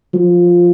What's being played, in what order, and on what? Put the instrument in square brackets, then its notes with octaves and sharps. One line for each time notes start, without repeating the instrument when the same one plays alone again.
[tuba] F3